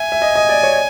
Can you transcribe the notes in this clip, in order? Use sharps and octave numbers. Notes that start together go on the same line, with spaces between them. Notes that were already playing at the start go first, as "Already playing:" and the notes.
Already playing: E5 G#5
E5
D#5
D#5
D5
C#5